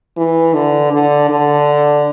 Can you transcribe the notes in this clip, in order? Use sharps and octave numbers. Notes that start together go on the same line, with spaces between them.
E3
D3
D3
D3